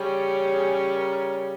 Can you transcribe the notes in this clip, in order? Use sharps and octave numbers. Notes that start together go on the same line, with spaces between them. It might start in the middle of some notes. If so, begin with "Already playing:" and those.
Already playing: C#3 G3 C#4
G#4
A#4